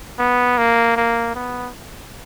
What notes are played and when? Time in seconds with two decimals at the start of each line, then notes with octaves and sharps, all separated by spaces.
0.19 B3
0.58 A#3
0.97 A#3
1.35 B3